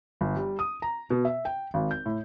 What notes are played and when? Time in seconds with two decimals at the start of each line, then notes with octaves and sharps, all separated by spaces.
0.21 G1
0.36 G3
0.59 D#6
0.82 A#5
1.10 B2
1.25 E5
1.45 G5
1.74 G#1
1.91 G6
2.06 A2